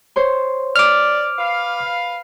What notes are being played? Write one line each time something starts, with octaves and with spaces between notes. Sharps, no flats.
C5 C#5 C6
D5 D6 F6
B4 F5